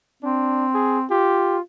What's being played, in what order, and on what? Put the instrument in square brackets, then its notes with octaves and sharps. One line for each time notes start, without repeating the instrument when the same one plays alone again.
[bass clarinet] C4 [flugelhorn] D4
[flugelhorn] G#4
[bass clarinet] F4 [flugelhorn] G4